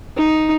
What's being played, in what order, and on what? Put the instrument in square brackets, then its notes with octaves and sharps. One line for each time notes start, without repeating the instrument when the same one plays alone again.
[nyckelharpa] D#4